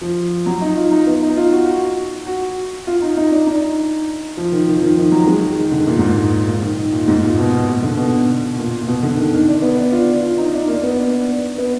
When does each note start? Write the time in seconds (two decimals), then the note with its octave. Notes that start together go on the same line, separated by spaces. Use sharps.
0.01 F3
0.46 F#3
0.61 D#4
0.77 F4
0.92 D#4
1.07 B3
1.22 D#4
1.37 F4
1.52 F#4
1.66 F#4
2.27 F#4
2.87 F4
3.02 D#4
3.17 D#4
3.31 D4
3.47 D#4
4.37 F3
4.52 D#3
4.67 D#3
4.77 F3
4.82 D#3
4.97 D#3
5.12 F#3
5.27 G#3
5.42 D#3
5.57 D#3
5.71 D3
5.87 A#2
5.98 G#2
6.10 A#2
6.48 A#2
6.62 D#3
6.77 D#3
6.92 A#2
7.08 G#2
7.22 A#2
7.38 B2
7.52 B2
7.68 A#2
7.83 D3
7.97 B2
8.58 A#2
8.81 A#2
8.87 B2
9.03 D3
9.17 D#3
9.33 D#3
9.48 D4
9.62 B3
9.78 D4
9.92 F4
10.22 F4
10.38 D#4
10.53 D4
10.68 A#3
10.83 B3
10.98 D4
11.58 B3